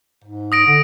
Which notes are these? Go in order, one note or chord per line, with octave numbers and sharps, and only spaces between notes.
G#2
D#6 A#6 D7
D3